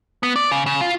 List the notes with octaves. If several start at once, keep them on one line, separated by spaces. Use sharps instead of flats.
B3
D5
C#3
C#3
F4